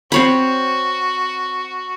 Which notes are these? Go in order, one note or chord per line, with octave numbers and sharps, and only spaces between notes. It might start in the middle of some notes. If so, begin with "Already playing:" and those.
C4 F#4 C#5 B5